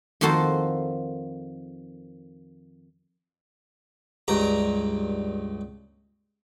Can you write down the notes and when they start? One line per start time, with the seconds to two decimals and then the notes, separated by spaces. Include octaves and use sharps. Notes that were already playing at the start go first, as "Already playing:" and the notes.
0.21 F2 D#3 A#3 F#4 A4 C5
4.28 C#2 G2 A#5